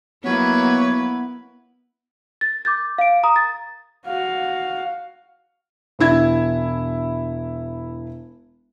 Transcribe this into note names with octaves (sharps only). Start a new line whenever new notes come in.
F#3 A#3 B3 E4 B4 C#5
A6
D6 G6 A6
F5 D7
A#5 D#6
A6
F#4 F5
E1 D4 E4 G#6